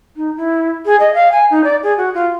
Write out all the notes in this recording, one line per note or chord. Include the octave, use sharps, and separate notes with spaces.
D#4
E4
G#4
D#5
F5
G#5
D#4
D5
G#4
F#4
F4